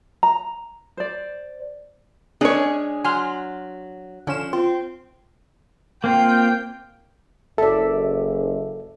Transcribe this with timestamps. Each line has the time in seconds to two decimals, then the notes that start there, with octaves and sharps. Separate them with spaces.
0.23 A#5
0.97 C5 D5
2.41 G#3 C#4 D4 G#4 C#5
3.04 F#3 G#5 C6 F6
4.27 D3 F3 C#4 E7
4.53 C4 F4
6.04 A#3 C4 F4 G5
7.58 F#1 A4 D5 E5